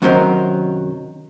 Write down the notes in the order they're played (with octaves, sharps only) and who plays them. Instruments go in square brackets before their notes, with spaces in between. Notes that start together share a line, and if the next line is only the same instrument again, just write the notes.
[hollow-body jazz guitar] F#2 C3 D#3 F#3 A#4 C5